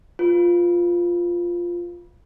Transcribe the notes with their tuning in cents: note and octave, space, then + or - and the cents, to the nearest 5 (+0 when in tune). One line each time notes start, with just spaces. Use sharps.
F4 +0 B4 +5